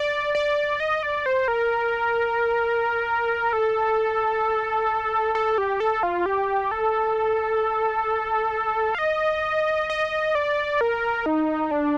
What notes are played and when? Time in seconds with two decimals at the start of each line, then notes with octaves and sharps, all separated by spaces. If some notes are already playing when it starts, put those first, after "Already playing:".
Already playing: D5
0.35 D5
0.80 D#5
1.03 D5
1.26 C5
1.48 A#4
3.53 A4
5.35 A4
5.58 G4
5.80 A4
6.03 F4
6.26 G4
6.71 A4
8.95 F5
8.98 D#5
9.90 D#5
10.35 D5
10.81 A#4
11.26 D#4
11.71 D4